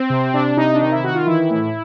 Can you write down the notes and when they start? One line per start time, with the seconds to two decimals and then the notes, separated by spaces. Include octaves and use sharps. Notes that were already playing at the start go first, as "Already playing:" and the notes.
Already playing: C4
0.10 C3
0.34 C3 D4
0.56 C3 D#4
0.74 D4
0.80 D#3 D#4
0.92 E4
1.04 D#3 F#4
1.15 F4
1.26 E3 E4
1.50 A2